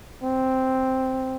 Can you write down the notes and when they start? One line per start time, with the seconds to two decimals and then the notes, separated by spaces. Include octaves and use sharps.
0.23 C4